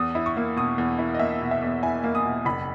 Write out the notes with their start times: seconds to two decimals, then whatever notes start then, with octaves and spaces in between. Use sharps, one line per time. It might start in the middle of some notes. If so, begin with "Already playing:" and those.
Already playing: E2 D#6
0.15 E4
0.26 C#6
0.37 A#3
0.56 B2 D#6
0.78 E2
0.99 E4
1.15 D#5
1.19 A#3 E5
1.41 B2
1.51 E5
1.62 E2
1.83 E4 G#5
2.04 A#3
2.15 D#6
2.25 B2
2.45 F#1 B5